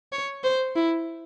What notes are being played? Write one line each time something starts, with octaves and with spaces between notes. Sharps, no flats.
C#5
C5
E4